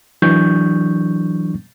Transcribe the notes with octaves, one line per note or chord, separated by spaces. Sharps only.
E3 F#3 D4 C#6 G6